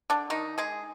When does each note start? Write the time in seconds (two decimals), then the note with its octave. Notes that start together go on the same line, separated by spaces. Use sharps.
0.10 D3 D4
0.30 D#3 D#4
0.58 G#3 G#4